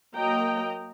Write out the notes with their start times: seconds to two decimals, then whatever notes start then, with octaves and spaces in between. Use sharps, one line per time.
0.16 F#3 A#3 D#5 G5 A#5